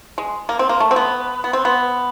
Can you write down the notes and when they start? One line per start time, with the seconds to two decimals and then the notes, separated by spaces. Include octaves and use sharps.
0.18 G#3
0.49 A#3
0.59 C4
0.69 A#3
0.80 A3
0.91 C4
0.96 B3
1.44 B3
1.53 C4
1.65 B3